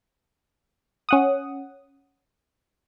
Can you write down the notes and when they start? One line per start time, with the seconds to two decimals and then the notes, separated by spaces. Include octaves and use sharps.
1.09 C#4 F#5 D#6